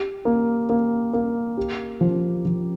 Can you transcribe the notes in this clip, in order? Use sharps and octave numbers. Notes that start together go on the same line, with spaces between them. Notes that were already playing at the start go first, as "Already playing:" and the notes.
Already playing: G4
A#3
A#3
A#3
G4
F3
F3